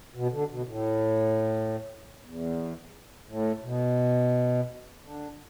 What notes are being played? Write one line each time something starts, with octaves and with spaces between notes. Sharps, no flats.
B2
D3
B2
A2
E2
A2
B2
D3